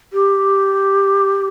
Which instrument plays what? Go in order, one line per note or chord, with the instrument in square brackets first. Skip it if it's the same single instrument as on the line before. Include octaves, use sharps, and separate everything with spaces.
[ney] G4